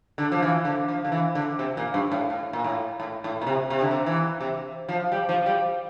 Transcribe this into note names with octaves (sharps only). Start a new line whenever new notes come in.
D3
F3
E3
D3
F3
D3
E3
D3
C3
A#2
G2
A2
A2
A#2
A2
A2
A2
A#2
C3
C3
D3
C3
E3
C3
F3
G3
F3
G3